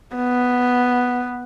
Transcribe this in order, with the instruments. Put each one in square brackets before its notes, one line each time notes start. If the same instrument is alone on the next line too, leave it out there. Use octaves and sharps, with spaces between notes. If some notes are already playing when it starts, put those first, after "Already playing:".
[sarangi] B3